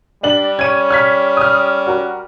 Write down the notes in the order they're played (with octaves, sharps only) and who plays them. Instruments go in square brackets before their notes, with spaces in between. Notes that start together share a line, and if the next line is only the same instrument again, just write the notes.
[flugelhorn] G3 [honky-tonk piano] D4 F#7
[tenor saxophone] C#4 [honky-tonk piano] G#6 D#7
[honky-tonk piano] F6 G#6 B6
D#6 F6
F#4 A#4